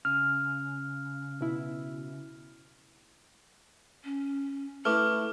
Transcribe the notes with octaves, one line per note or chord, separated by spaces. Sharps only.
C#3 F6
B2 E4
C#4
A3 E4 B4 D6 F6